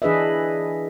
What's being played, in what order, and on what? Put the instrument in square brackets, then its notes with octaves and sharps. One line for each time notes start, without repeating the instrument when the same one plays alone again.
[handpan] E3 D4 G#4 B4 D#5 E5